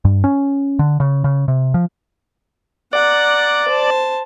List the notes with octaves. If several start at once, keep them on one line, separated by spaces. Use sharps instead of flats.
G2
C#4
D3
C#3
C#3
C3
F3
D5 F#5 A#5
C5 A5